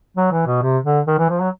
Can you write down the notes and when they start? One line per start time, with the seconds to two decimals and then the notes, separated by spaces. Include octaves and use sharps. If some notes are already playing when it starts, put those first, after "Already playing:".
0.17 F#3
0.31 E3
0.47 B2
0.62 C3
0.84 D3
1.07 D#3
1.18 E3
1.30 F3
1.41 F#3